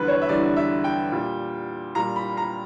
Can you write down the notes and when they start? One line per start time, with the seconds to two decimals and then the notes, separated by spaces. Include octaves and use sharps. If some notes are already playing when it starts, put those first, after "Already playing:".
Already playing: E2 D3 G3 B4
0.08 C#5
0.22 E5
0.29 E2 D3 G3 D5
0.56 E5
0.84 G5
1.12 A#2 G3
1.95 A#2 G3 A#5
2.16 B5
2.37 A#5